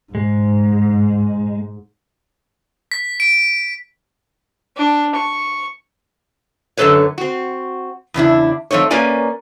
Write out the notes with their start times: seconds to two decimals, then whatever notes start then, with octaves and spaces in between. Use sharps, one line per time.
0.15 G#2 G#3
2.92 B6
3.20 D7
4.77 D4
5.15 C#6
6.77 F#2 D3 G#3 A4 B4 C#5
7.18 C4 F#4
8.14 E2 C#3 D4 E4
8.71 F3 A3 C4 D#4 C#5
8.90 A#3 C#4 A#4 B4 D5 G#5